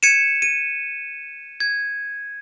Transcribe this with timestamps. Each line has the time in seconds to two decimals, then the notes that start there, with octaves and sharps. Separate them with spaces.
0.03 G#6 C#7 D#7 E7
0.42 D#7
1.60 G#6